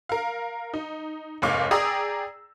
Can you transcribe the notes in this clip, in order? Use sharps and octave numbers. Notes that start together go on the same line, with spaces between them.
A#4 F5
D#4
F1 D#2 G#2 C#5 F5 D6
G#4 D5 G5 A#5 D#6 E6